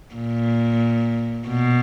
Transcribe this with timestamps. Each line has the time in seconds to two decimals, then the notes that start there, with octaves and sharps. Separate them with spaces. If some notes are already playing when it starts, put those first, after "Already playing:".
0.15 A#2
1.47 B2